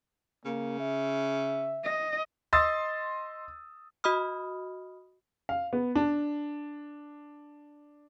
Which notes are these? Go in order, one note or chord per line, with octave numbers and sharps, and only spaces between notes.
C#3 A#3
E5
D#5
D#5 C6 D#6 E6 A6
F#4 D#5 B5 D#6 F6
F5
B3
D4